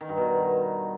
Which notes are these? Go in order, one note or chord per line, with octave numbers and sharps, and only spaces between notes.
D#3
G2
B2